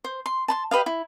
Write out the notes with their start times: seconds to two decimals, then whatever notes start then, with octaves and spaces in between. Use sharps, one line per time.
0.04 C5
0.26 C6
0.48 A5 B5 C6
0.71 G4 B4 D#5 F5
0.86 E4